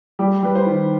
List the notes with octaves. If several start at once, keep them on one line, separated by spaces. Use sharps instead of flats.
G3 G4
G3 B4
C5
D#3